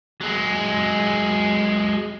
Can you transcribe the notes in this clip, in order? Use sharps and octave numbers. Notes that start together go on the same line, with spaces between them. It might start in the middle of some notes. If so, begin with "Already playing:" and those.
F#3 G#3